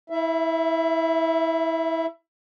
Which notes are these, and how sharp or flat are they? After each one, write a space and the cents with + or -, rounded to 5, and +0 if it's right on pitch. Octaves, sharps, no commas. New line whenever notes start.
E4 -20 E5 +20